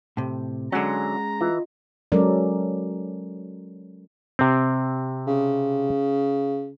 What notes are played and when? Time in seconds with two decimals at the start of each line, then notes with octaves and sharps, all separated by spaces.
0.17 A2 C3
0.72 D3 F#3 G#3 C#4 F#5 G#5 A#5 C6
1.41 E3 F4 D#5
2.12 F#3 G#3 C#4 A4 A#4 D5
4.39 C3 C4
5.27 C#3